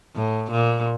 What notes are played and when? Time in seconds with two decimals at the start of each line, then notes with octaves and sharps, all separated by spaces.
0.15 A2
0.51 A#2